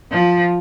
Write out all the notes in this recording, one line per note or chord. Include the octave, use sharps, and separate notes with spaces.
F3